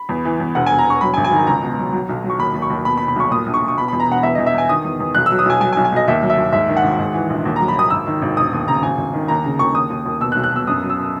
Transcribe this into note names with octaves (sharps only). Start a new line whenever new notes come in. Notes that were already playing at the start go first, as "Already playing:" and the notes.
Already playing: B5
E2
E3
E2
E1 F#5
G#5
E1
A#5
E1 C#6
F#3 B5
G#5
G#1
G#5
D#3 A#5
C#2 A#5
B2
F#3
F#3
B1
F#3
C#6
D#2 B5
D#2
C#6
D#2
B2 B5
B5
B2
B5
B1 C#6
A#2 D#6
A#1
C#6
A#1
C#6
B2 B5
B5
E2
A#5
E1 F#5
E2 E5
E2 D#5
E5
E2 G#5
D#3 D#6
E2
E2
B1 F#6
E6
F#3
D#6
B1 G#5
F#3 G#5
G#5
B1
G#5
B1 D#5
D#2 E5
F#3
E5
D#2
G#2 E5
D#3
F#5
G#1
G#2
E3
A#1
D#2
A#5
F#3
B5
D#2 D#6
G#1 E6
D#3
G#1
E1 D#6
D#2
C#3 A#5
G#1 G#5
G#1
D#3
D#2 A#5
C#3
D#2 C#6
D#2 D#6
D#2
D#2
B2 E6
F#6
B1
F#6
B2 E6
F#2 D#6
F#3
E6